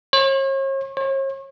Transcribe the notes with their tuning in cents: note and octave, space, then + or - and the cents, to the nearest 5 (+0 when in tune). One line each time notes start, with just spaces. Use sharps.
C#5 -40
C#5 -40